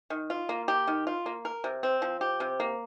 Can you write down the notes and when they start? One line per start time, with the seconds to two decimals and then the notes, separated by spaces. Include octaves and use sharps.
0.10 D#3
0.30 F4
0.49 A#3
0.68 G4
0.87 D#3
1.07 F4
1.26 A#3
1.45 A#4
1.64 C3
1.83 C4
2.02 F3
2.21 G4
2.40 C3
2.60 A#3